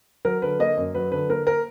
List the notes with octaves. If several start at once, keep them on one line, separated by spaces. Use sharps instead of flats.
F#3 A#4
D3 B4
A#3 D#5
F#2
F#3 B4
D3 B4
A#3 A#4
A#4